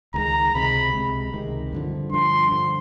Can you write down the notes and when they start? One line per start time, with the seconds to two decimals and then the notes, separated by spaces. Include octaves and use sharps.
0.14 C#2 C3 D#3 G#3 A#5
0.54 C#2 C3 D#3 G#3 B5
0.93 C#2 C3 D#3 G#3
1.33 C#2 C3 D#3 G#3
1.73 G2 D3 F3
2.12 G2 D3 F3 C6
2.51 G2 D3 F3